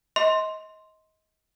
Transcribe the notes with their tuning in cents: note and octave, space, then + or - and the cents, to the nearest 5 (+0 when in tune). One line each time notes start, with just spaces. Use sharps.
D#5 +25 C6 +0